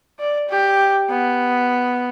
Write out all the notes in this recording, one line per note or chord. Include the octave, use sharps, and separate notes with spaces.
D5
G4
B3